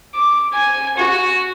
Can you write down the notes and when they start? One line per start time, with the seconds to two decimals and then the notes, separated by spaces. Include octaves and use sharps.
0.15 D6
0.54 G#5
0.98 F#4